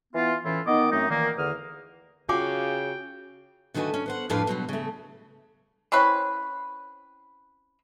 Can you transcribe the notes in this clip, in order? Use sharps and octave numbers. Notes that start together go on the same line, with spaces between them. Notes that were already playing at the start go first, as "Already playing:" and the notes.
E3 B3 E4 F4
A2 E3 C#4 E4 F4
D#3 B3 D#4 D#5 D6
F#2 A3 C4 D#4
A#2 D#3 E3 A#3
E2 D3 D#6 F6
C#3 F4 F#4 F5 G5 G#5 D6
D3 D#3 A3 F#4 B4 G#5
C#4
B3 C5 F#5
F2 A2 D4 G#4 B4 F5
B2 F#3 G3
C#3 A3
C4 C#4 E4 B4